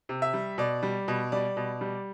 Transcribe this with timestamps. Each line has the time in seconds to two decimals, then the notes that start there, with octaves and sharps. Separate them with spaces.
0.09 C3
0.22 E5
0.33 G3
0.58 B2 D5
0.83 G3
1.08 B2
1.32 G3 D5
1.57 B2
1.81 G3